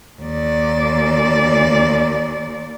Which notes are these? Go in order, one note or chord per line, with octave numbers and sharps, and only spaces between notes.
D#2 D5